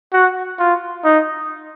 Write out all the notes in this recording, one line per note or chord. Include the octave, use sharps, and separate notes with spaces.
F#4
F4
D#4